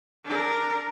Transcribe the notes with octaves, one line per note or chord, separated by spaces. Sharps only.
D4 A#4